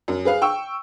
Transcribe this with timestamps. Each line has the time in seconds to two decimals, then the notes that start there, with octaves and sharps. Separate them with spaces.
0.08 F#2
0.25 G#4 B4 F5
0.42 G5 C#6 E6